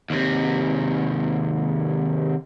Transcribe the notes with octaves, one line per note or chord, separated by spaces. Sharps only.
D#2 C3